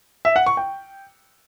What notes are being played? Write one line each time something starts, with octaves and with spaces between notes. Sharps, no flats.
E5
F#5
C#6
G5